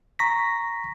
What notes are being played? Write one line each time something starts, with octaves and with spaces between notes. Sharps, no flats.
A#5 C#6 A#6 B6